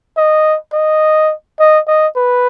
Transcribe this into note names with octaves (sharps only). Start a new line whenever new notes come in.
D#5
D#5
D#5
D#5
B4